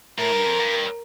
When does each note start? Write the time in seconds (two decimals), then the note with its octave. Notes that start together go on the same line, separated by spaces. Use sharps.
0.18 A2 A#4
0.32 G2
0.46 F2
0.59 G2